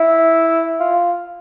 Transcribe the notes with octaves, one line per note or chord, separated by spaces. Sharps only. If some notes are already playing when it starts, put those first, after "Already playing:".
Already playing: E4
F4